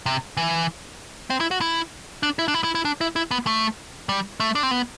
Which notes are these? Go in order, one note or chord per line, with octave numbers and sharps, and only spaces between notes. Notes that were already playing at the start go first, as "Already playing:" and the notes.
C3
E3
C4
E4
F#4
E4
D4
E4
D4
E4
E4
E4
D4
E4
E4
B3
A3
G3
A3
D4
C4
B3